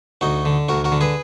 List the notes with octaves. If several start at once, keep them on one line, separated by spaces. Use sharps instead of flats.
D2 D#4 F#4
D3
D2 F#4 A#4
F#4 A#4
D3
G#4 B4